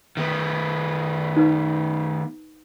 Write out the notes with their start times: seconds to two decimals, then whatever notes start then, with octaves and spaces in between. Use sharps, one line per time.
0.17 D#3 B3
1.37 D#4 B4